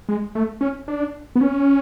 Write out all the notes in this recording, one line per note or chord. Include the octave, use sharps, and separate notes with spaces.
G#3
A3
C#4
D4
B3
C#4